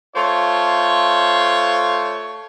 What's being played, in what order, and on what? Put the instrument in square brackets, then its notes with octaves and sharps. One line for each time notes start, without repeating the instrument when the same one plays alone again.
[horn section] A3 F4 C5 C#5